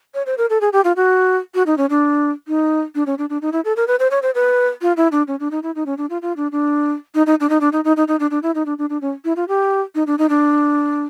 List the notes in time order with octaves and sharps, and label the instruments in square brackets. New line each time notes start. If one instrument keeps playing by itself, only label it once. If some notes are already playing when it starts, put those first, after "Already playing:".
[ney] C#5
C5
A#4
A4
G#4
G4
F4
F#4
F#4
D#4
C#4
D4
D#4
D4
C#4
D4
D4
D#4
E4
A4
A#4
B4
C5
C#5
C5
B4
F4
E4
D4
C#4
D4
D#4
E4
D#4
C#4
D4
F4
F4
D4
D4
D#4
D#4
D4
D#4
D4
D#4
D#4
D#4
D#4
D4
D4
E4
D#4
D4
D4
D4
C#4
E4
F4
G4
D#4
D4
D#4
D4